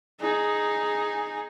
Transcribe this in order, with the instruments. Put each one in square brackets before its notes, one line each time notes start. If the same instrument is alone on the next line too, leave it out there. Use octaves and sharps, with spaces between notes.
[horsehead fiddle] D#4 G#4